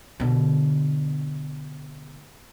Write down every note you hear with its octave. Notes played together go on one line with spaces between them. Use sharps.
B2 D3